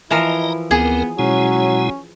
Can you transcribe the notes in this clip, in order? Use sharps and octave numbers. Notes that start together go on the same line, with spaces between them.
E3 F3 E4 A#4 D#5 A#5
D2 B3 C4 G#4 A#4
B2 F#3 G#3 C#4 E4